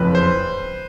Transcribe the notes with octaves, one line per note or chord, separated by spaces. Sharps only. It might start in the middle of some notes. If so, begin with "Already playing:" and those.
Already playing: F#1 F2 C#3 B4
C5